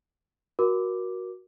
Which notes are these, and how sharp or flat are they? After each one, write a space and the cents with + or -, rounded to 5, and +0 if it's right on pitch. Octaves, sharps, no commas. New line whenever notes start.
F#4 +0 A#4 +25 D6 +0